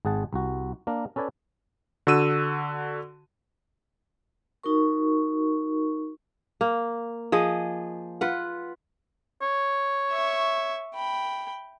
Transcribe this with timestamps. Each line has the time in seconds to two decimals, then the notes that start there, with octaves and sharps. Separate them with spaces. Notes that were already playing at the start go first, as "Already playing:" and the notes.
0.05 G#1 G#4 F#5 A5
0.33 C2 F#4
0.87 A#3 D4 A#4
1.16 C#4 A4 B4 D5 G#5
2.07 D3 F#4 E6 D#7
4.64 D#4 F#4 A#4 C#6
6.61 A#3
7.32 F3 G#4 D#5
8.21 F4 B4 F#5
9.42 C#5
10.11 E5 C#6
10.95 G5 B5